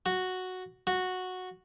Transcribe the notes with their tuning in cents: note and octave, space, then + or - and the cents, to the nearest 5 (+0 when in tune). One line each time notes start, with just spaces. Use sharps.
F#4 -5
F#4 -10